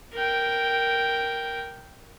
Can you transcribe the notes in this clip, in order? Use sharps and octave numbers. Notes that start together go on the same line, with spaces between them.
A#4 G5